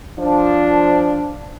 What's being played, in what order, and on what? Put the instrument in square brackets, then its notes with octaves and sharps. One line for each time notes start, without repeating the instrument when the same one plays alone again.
[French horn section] F3 D4